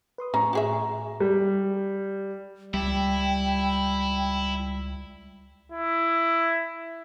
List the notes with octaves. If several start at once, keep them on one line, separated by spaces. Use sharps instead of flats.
B4 C6 D#6
A2 F3 C#4 A#5 C#6
F#4 G#4 E5
G3
C#2 G3 E4 G5
E4